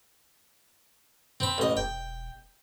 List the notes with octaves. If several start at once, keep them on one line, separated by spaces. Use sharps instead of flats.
F2 C4 B5
A1 D#5
E1 G5